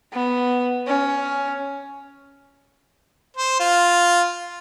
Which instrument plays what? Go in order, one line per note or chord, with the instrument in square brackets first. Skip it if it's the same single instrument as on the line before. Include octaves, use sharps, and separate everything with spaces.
[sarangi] B3
C#4
[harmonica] C5
F4